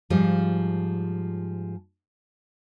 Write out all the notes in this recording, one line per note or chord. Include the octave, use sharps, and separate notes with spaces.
G#2 F3 G3 F4